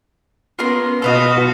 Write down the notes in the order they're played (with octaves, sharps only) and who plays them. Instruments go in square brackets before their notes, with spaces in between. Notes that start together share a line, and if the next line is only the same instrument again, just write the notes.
[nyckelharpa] B3 C#4 [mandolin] F4 A#4 C6
[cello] B2 F#4 [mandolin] A4 B4 D#5 [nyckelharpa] F5 A5